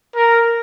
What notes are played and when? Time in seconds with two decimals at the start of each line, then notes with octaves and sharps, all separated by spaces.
0.16 A#4